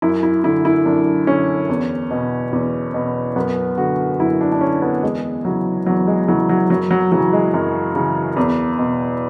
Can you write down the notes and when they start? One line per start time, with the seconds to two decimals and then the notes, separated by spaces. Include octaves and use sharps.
0.02 F#2 E4
0.23 E4
0.44 D3 E4
0.65 E4
0.86 F#2 D4
1.27 D3 C#4
1.69 E2
2.11 B2
2.53 E2
2.94 B2
3.36 F#2 B3
3.78 D3 F#4
4.20 F#2 E4
4.41 D4
4.52 D4
4.61 D3 C#4
4.82 B3
5.03 E2 G#3
5.45 C#3 E3 F#3
5.86 E2 F#3
6.07 G#3
6.28 C#3 E3 F#3
6.49 F#3
6.70 F#2 F#3
6.91 F#3
7.12 C#3 E3 F#3
7.33 G#3
7.54 F#2
7.95 C#3 E3
8.37 E2
8.79 B2